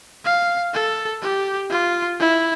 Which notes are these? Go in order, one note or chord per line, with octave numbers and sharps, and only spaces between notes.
F5
A4
G4
F4
E4